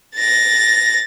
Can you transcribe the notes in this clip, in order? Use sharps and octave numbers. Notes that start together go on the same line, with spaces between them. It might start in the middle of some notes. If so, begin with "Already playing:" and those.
A6 A#6